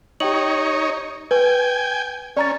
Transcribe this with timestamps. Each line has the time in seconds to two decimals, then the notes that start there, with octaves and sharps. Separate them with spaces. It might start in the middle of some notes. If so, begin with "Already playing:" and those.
0.20 D#4 G4 C#5 G5 F#7
1.31 B4 G5 G#5
2.37 C#4 D5 A#5 A6